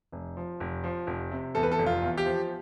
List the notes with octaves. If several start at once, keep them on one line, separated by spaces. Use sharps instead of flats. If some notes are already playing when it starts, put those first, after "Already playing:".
F1
F3
F1
F3
F1
C3
E2 A4
B4
A4
F1
F4
E2
G4
F3